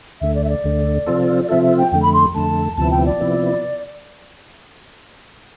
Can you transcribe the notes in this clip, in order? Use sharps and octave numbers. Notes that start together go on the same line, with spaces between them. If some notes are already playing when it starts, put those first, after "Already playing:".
D2 D3 A3 E5
D5
E5
D5
D2 D3 A3
C3 F3 C4 F4 A4
D5
C3 F3 C4 F4 A4 E5
E5
G5
F2 D3 A3 G5
B5
C6
F2 D3 A3 A5
D2 C3 F3 B3 E4 A5
G5
D5
C3 F3 B3 E4